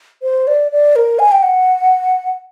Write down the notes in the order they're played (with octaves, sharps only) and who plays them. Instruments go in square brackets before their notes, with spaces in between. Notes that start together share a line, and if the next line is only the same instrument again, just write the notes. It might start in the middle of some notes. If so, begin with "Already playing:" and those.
[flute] C5
D5
D5
A#4
G#5
G5
F#5